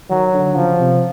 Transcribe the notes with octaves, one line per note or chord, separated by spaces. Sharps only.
D#3 F#3
D3
C#3 F3
C3